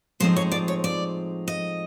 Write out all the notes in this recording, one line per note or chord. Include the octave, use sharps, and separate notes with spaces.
A2 F3 G#3 C4 D#4 C5
C#5
D5
C#5
D5
D#5